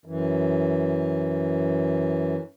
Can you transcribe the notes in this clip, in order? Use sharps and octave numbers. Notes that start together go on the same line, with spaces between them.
F#2 E3